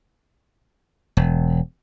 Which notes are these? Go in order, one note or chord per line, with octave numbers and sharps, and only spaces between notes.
E1